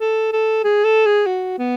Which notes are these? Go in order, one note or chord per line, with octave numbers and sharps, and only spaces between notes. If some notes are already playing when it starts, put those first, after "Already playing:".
A4
A4
G#4
A4
G#4
F#4
B3